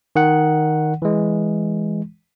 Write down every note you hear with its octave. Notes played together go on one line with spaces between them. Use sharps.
D#3 F#5
E3 G#3